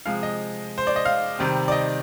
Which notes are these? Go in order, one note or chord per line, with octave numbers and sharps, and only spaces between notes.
C3 F3 G#3 F5
D#5
C5
D5
D#5
F5
C3 D#3 G3 C4
D5
D#5